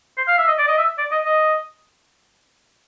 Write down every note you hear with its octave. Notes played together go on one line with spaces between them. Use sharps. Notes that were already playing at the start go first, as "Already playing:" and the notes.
C5
F5
E5
D#5
D5
D#5
E5
D5
D#5
D#5